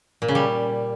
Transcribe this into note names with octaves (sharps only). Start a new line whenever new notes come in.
A#2
C#3
G3